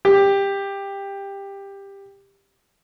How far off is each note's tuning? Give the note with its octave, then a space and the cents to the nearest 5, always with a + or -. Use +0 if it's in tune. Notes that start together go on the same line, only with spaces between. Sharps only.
G4 +15